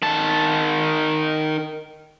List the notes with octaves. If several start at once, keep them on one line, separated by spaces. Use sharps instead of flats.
D#3 A5